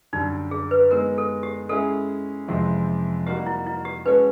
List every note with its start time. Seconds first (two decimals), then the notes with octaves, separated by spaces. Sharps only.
0.13 F#2 D3 G3 D#4
0.51 G#4
0.71 B4
0.91 G#3 B3 D#4 A#4
1.18 A4
1.43 G4
1.69 G#3 C#4 E4 G#4 A4
2.48 F2 C3 E3 G#3 C4
3.26 G3 A#3 D#4 F#4 G4 A#4
3.46 E4
3.66 E4
3.85 G4
4.05 G#3 C#4 F#4 A4 B4 C#5